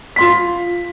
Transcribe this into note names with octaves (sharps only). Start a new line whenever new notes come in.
F4 C6 B6